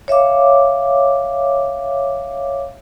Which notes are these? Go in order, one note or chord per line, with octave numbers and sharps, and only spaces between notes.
C#5 E5 F5 D6